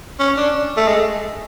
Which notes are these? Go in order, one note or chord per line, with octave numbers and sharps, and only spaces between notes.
C#4
D4
A3
G#3